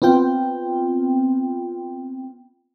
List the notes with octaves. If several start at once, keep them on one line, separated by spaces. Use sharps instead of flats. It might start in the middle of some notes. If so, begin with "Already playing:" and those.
B3 C4 F4 G5